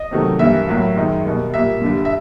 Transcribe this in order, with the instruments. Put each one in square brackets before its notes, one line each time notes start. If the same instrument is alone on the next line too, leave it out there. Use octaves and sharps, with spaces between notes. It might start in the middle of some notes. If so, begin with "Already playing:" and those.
Already playing: [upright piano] D#5
C3 D#3 F#3 A3
G2 E3 G3 A#3 E5
A2 F#3 A#3
F#2 D#3 G#3
B2 G3 A#3
A#2 G3 A#3 E5
G2 D3 G3
E5